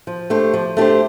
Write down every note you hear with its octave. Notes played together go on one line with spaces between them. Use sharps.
F3
A3 D4 G4 C5
F3
A3 D4 G4 C5